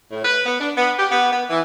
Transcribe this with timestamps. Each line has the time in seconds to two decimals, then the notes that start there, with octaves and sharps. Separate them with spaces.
0.12 A2
0.25 B4
0.46 B3
0.60 D4
0.77 B3
0.98 G4
1.11 B3
1.33 B3
1.50 E3